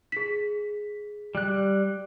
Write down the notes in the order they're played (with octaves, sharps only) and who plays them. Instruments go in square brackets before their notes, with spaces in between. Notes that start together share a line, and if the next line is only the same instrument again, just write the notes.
[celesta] G#4 B6
[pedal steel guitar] G3 F#6